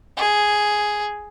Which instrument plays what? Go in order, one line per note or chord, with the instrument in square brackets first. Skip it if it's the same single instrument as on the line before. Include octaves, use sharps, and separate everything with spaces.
[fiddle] G#4